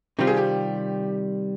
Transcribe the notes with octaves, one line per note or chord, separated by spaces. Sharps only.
C3 D#3 G3 C4 F4 G4
G#4
G4